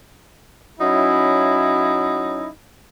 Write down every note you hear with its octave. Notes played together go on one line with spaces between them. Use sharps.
F#3 C#4 D#4 E4